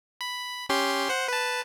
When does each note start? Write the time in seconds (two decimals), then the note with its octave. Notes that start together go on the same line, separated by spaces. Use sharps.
0.21 B5
0.69 C#4 G4 C6
1.09 C5 F#5
1.28 B4 A5